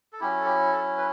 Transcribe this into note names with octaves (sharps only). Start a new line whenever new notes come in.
A4
F#3 C#4 E4 G4
A4
G4
A4
B4